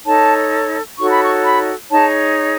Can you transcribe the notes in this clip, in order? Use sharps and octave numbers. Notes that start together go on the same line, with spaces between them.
D#4 A4 C#5 A5
D#4 F#4 A4 C#5 C#6
B5
C#6
B5
D#4 G#4 C#5 A5